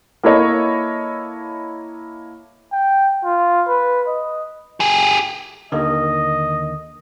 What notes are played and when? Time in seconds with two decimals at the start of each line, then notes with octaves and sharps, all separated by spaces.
0.23 A#3 E4 A4 C#5 D#5
2.73 G5
3.25 F4
3.67 B4
4.08 D#5
4.80 G4 G#4
5.72 D#2 D3 D#3 D#5